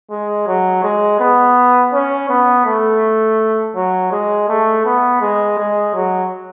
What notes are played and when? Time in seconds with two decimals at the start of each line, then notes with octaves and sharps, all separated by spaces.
0.11 G#3
0.47 F#3
0.83 G#3
1.20 B3
1.94 C#4
2.29 B3
2.66 A3
3.76 F#3
4.12 G#3
4.49 A3
4.85 B3
5.21 G#3
5.58 G#3
5.95 F#3